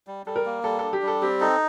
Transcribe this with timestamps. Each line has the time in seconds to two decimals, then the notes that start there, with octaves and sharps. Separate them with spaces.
0.07 G3
0.26 G3 A4
0.36 A#4
0.46 A#3
0.64 G3 A4
0.79 D4 A4
0.93 G4
1.02 G3
1.08 A4
1.22 C4 G4
1.41 D#4 A4